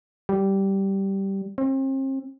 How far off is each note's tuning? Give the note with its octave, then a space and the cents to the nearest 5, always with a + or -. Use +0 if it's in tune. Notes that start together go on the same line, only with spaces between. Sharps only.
G3 -10
C4 +40